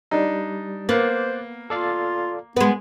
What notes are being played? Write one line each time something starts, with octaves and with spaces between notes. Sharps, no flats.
G3 D4 D#4
A#3 B3 C5 D6 F#6 A6
F4 A4 D5 F5
G#3 B3 B4